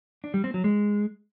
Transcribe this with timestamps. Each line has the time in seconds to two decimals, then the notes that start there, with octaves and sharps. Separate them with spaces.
0.24 D4
0.34 G3
0.44 C4
0.54 F#3
0.64 G#3